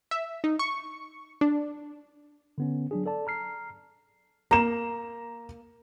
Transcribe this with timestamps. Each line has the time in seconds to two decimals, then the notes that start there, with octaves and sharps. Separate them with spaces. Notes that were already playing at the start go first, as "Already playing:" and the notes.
0.11 E5
0.44 D#4
0.59 C#6
1.41 D4
2.58 D3 B3 C#4
2.91 F#3 D4 G#4
3.06 A4 D5 A5
3.27 A#5 F6 C7
4.51 A#3 A#5 E7